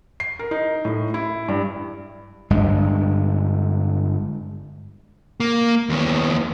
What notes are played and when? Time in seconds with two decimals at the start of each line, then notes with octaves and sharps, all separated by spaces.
0.20 C7
0.39 A#4
0.51 D#4
0.85 A2
1.14 E4
1.48 G2
2.50 G1 G2 G#3
5.40 A#3
5.89 D#2 B3